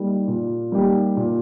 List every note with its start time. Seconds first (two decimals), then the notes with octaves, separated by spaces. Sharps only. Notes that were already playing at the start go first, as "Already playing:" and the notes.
Already playing: G3 A#3 D#4 G4
0.28 A#2
0.72 G3 A#3 D#4 G4
1.17 A#2